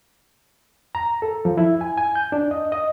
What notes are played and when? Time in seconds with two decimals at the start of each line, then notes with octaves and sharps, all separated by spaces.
0.95 A#5
1.22 A4
1.45 F3
1.57 E4
1.81 G#5
1.98 G#5
2.15 G6
2.32 D4
2.51 D#5
2.72 D#5